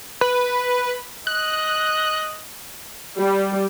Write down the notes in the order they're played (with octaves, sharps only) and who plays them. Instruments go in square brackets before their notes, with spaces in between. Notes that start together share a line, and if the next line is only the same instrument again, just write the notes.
[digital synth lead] B4
[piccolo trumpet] D#5 [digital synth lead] F#6
[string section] G3